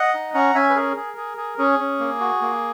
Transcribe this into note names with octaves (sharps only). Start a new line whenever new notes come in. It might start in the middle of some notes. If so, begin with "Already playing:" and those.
Already playing: D#5 F#5
D#4
C#4 F#5 A#5
C#4 E5 G#5
B4
G#4 A#4
G#4
G#4
G#4
C#4 G#4
C#4
A#3
F#4
A#3